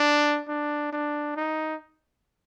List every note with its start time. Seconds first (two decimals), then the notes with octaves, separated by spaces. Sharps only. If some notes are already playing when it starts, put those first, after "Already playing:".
Already playing: D4
0.48 D4
0.93 D4
1.36 D#4